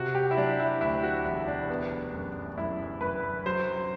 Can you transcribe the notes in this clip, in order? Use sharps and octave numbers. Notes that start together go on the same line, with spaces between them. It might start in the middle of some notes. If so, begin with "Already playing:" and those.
Already playing: C3 F#4
G4
E4
F#3 D4
E4
D2 E4
F#4
E1 E4
D4
B3
F#2
F#2 E4
F#2 B4
F#3 C5